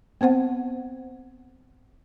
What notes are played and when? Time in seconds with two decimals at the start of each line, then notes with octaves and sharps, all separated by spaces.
0.21 B3 C4 C5 F#5